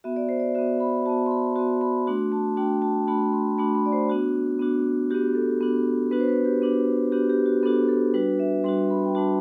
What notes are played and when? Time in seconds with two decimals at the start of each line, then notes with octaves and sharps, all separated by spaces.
0.04 B3 F#4 E5
0.16 D5
0.29 C5
0.40 D5
0.55 B3 F#4 E5
0.80 B5
1.05 F#4 A5
1.09 B3
1.26 C6
1.31 B5
1.56 F#4 C6
1.59 B3
1.81 B5
2.07 A3 D4 F#4 C6
2.32 A5
2.57 A3 D4 F#4 G5
2.82 A5
3.07 A3 D4 F#4 B5
3.33 C6
3.58 A3 D4 F#4 B5
3.75 B5
3.86 D5
3.92 C5
4.09 B3 D4 F#4
4.59 B3 D4 F#4
5.10 B3 D4 F#4 G4
5.35 A4
5.61 B3 D4 F#4
6.11 B3 D4 F#4 B4
6.20 C5
6.28 B4
6.45 G4
6.62 B3 D4 F#4
7.12 B3 D4 F#4 G4
7.29 G4
7.46 F#4
7.63 B3 D4 F#4 A4
7.89 A4
8.14 G3 D4 F#4 B4
8.39 E5
8.64 G3 D4 F#4 C6
8.90 B5
9.05 G5
9.15 G3 D4 F#4 A5